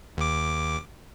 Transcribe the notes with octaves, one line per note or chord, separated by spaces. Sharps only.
D#2 D6